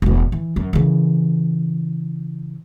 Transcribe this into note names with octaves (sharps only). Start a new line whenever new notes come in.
E1 B2
E3
F#2
C#3 E3